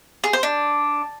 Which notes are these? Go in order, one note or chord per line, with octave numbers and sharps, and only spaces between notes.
G#4
C5
D4